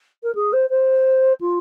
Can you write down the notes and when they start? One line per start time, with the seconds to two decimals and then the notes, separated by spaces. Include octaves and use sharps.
0.23 A#4
0.34 G#4
0.52 C5
0.69 C5
1.40 F4